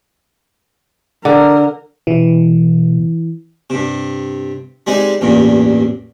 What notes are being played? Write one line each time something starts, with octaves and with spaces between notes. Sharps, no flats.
D3 A#4
B2 E3
G2 C3
G3 G#3 C4 D#4
A1 E2 G2 A#2